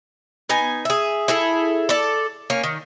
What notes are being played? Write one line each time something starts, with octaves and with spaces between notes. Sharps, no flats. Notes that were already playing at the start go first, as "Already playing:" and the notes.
B3 D#4 G#5
G#4 E5
E4 G#4 A4
A4 D5
A#3 C#4
D#3